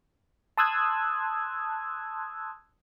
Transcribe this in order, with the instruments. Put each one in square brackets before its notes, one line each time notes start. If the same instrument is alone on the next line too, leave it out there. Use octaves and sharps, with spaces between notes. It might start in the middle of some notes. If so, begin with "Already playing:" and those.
[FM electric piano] A5 C6 D#6 E6 F#6 G#6